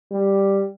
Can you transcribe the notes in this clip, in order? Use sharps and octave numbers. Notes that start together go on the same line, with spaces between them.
G3